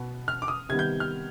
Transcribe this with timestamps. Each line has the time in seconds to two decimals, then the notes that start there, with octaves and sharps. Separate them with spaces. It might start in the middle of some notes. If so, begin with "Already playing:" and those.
Already playing: B2 B3
0.28 F6
0.42 D6
0.48 D#6
0.69 C3 D#3 G3 B3 G#6
0.79 G6
1.00 F6